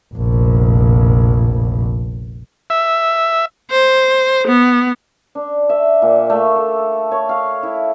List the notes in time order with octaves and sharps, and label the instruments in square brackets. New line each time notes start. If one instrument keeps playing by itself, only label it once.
[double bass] F1 A#1
[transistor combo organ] E5
[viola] C5
B3
[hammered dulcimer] D4
E5
A#2
A3
A4
C#5
F5
E4